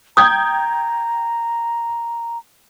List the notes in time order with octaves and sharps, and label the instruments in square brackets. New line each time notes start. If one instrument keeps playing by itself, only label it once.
[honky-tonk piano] G5 G6 G#6 [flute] A#5 [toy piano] D#6